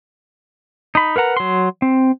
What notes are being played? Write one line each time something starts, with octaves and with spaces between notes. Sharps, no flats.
D#4 B5
A#4 B4 F#5 A#5
F#3 C6
C4